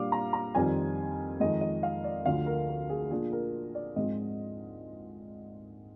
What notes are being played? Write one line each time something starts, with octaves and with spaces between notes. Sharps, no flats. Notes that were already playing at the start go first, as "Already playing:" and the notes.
Already playing: A#2 G3 D4 F4 F5 D6
A#5
A#5
F2 D#3 G3 C4 F4 G#5
F2 D#3 G#3 D#5
D#5
F5
D5
D2 D3 F3 F5
A#4
A#4
G#4
A#2 F3 A#3 D4 F4 G#4
A#4
D5
G#2 F3 G#3 C4 F4 D#5